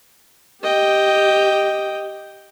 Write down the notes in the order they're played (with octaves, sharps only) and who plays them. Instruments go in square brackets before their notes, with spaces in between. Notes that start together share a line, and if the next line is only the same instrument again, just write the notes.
[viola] G4 [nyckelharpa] D#5 G5